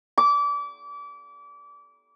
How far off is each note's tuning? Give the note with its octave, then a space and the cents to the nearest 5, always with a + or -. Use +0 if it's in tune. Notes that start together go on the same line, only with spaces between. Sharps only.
D6 -30